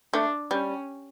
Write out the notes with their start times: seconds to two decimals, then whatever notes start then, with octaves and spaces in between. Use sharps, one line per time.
0.13 A3 D4
0.51 G3 C#4